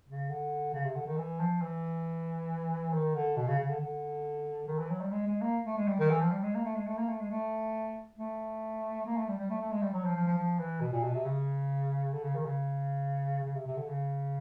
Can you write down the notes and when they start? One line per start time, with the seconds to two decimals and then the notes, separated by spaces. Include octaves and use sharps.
0.08 C#3
0.30 D3
0.74 C#3
0.85 C3
0.95 D3
1.07 D#3
1.18 E3
1.40 F3
1.62 E3
2.93 D#3
3.15 D3
3.37 B2
3.48 C#3
3.59 C#3
3.69 D3
3.80 D3
4.68 D#3
4.79 E3
4.90 F#3
5.01 G3
5.12 G#3
5.27 G#3
5.41 A#3
5.66 A3
5.77 G#3
5.88 G3
5.99 D#3
6.10 E3
6.21 F3
6.32 G3
6.43 G#3
6.55 A#3
6.65 A3
6.76 G#3
6.87 A3
6.98 A#3
7.09 A3
7.21 G#3
7.31 A3
8.19 A3
9.06 A#3
9.17 A3
9.29 G3
9.39 G3
9.50 A3
9.61 A3
9.72 G#3
9.83 G3
9.93 F#3
10.05 F3
10.16 F3
10.27 F3
10.38 F3
10.59 E3
10.81 B2
10.93 A#2
11.04 B2
11.15 C3
11.25 C#3
12.13 D3
12.23 C#3
12.35 D#3
12.46 C#3
13.44 C#3
13.55 C3
13.66 C3
13.77 D3
13.88 C#3